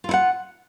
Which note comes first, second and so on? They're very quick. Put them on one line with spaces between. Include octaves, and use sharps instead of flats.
F4 E4 F#5